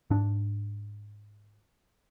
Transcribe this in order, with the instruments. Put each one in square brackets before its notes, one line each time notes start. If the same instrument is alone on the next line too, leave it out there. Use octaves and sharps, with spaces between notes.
[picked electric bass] G#2 D4